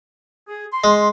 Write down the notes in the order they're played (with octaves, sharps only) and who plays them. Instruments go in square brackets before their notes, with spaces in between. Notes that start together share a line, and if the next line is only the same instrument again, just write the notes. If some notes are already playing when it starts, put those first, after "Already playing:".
[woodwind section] G#4
C6
[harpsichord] G#3